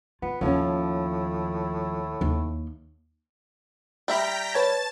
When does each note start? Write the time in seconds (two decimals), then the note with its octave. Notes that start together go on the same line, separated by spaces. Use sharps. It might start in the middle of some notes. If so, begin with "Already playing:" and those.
0.22 B3 F4
0.41 D#2 A2 D#3 F3 C#4
2.21 D#2
4.08 G3 E5 G5 A#5 B5 B6
4.54 B4 C#5 A5 G#6 A6